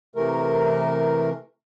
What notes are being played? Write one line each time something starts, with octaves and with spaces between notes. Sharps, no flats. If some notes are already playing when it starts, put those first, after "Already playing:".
C3 E3 A3 A#4